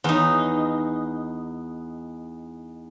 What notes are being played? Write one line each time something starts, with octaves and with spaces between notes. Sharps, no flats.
E2 D#4